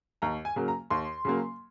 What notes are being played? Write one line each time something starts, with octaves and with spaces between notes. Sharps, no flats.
D#2 A#5
G#5
C#3 F#3 A#3
A#5
D#2 C6
C#3 F#3 A#3